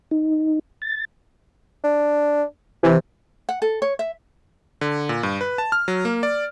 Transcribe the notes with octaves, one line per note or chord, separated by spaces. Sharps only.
D#4
A6
D4
C3 E3
F#5
A4
C#5
E5
D3
A#2
G2
B4
A5
F6
F#3
A#3
D5